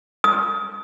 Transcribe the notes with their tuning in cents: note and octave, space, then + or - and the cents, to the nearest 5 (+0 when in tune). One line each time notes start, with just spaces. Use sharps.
D#6 +25